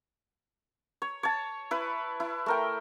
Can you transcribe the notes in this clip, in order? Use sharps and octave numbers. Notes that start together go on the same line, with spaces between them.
C#5
C#5 A5
E4 B4
E4
A3 A#4 G5